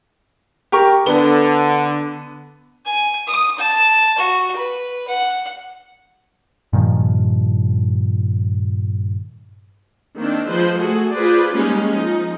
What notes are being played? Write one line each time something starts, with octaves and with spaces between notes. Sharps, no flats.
G4 A#4 C#6
D3 B3 G7
G#5
D#6
A5
F#4
B4
F#5
G2 A#2 D#3 F3
D#3 A#3 C4 D4
F3 G#3 B4 C5
A3 F#4 G#4 A4
F4 G#4 B4 C5 D5
G3 G#3 A#3 C#4 D#4
F3 D#4